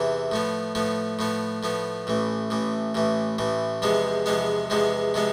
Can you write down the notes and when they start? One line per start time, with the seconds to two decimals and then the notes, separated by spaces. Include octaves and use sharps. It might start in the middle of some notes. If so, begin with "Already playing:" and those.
Already playing: E2 C3 E3
0.31 A2 F3 B3
0.75 A2 F3 B3
1.19 A2 F3 B3
1.63 A2 F3 B3
2.07 A1 A2 E3
2.50 A1 A2 E3
2.95 A1 A2 E3
3.38 A1 A2 E3
3.82 E2 C3 F3 G#3 B3
4.26 E2 C3 F3 G#3 B3
4.70 E2 C3 F3 G#3 B3
5.14 C3 F3 G#3 B3